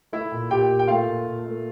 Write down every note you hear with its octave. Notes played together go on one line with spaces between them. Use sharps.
A3 E4 E5
A#2
A#2 G4 G5
A#2
G5
A3 F4 F5
A#2
A#2
A3